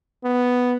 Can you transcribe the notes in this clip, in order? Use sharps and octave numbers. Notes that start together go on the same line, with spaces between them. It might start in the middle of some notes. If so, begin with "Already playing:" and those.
B3